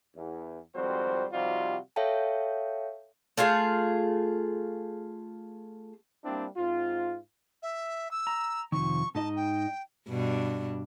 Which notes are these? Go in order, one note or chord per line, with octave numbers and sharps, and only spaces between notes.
E2
G#1 F2 G3 F#4 C5
C3 F3 G3 D#4 F4 F#4
A4 C#5 E5 F5 G5 A5
A3 F4 G#4 F5
G3 A#3 C4 D4 E4
G#2 C4 F4
E5
E6
A#5
F2 C3 D#3 C#6
G#2 D#4 D#5 A5
G5
G2 B2 D4